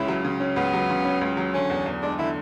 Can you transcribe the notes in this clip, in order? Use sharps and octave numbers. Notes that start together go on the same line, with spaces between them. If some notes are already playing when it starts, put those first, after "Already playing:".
Already playing: C#2 C#3 C#4 E4
F#3
C#3
C#4
C#2 B3
F#3
C#3
C#4
C#2
F#3
D3 C#4
E2
E2
G#3 D4
D3 E4